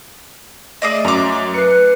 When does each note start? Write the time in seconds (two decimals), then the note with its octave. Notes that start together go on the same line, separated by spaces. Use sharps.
0.82 A3 G#4 D5 D#5
1.05 F#2 A#5 D6
1.54 B4 C7 C#7